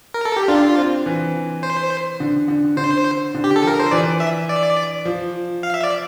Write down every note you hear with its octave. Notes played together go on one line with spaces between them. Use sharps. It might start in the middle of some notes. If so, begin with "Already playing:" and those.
A#4
A4
G4
D4 F4
C4
E3
C5
D3
D3
D3 C5
D3
G4
A4
F3 A#4
C5
E3 D5
E5
D5
F3
F5
E5
D5